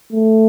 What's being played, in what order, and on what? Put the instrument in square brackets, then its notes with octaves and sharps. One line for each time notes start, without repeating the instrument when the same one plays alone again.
[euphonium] A3